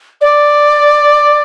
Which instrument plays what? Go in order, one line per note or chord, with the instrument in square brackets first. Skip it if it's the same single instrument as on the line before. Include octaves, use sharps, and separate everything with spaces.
[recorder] D5